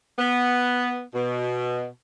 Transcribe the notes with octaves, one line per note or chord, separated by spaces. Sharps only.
B3
B2